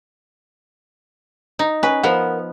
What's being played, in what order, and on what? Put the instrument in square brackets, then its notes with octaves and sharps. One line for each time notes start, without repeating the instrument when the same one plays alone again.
[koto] D#4
[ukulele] C#4 G#5 [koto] B4
[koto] F3 B3 [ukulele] A#4 F#5